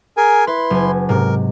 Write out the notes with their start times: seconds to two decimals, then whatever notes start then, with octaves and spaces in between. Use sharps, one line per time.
0.17 G#4 A#4 G#5
0.47 E4 B4 C6
0.70 F#1 G#5
1.09 G#2 C3 A#4